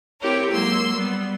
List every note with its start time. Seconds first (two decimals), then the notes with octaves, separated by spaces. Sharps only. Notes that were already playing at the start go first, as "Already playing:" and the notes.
0.21 C4 E4 G4 A#4 C#5
0.51 F#3 G#3 A#3 C6 E6
0.95 G3 B3